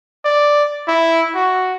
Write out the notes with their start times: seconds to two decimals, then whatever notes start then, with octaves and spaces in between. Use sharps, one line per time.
0.25 D5
0.87 E4
1.35 F#4